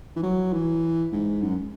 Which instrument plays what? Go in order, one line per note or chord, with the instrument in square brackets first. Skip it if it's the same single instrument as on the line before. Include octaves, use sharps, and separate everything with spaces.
[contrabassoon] E3
F#3
E3
G#2
F#2